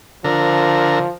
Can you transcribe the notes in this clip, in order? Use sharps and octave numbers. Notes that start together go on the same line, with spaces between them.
D3 F3 A#4